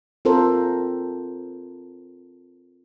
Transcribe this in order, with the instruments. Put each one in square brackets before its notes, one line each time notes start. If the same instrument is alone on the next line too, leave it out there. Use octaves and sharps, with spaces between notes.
[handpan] C4 F4 A4 A#4 C5